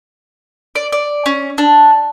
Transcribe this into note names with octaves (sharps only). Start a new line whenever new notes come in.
D5
D5
C#4
D4